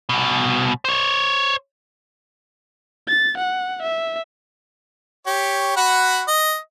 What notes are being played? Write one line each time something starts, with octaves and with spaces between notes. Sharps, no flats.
C2 B2
C5 C#5
A6
F#5
E5
G4 C#5
F#4 F#5 B5
D#5